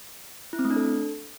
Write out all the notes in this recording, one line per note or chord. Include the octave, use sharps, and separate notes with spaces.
E4
C4
A3
D4
A4